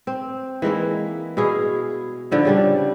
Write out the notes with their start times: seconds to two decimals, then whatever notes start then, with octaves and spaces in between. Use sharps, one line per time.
0.07 C4
0.62 E3 G#3 A#3 E4
1.37 B2 E4 G#4 F5
2.31 D3 F3 E4
2.45 C#3 G3 D4